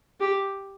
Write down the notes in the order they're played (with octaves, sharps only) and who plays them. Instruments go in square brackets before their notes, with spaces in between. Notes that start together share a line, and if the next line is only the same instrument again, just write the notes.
[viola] G4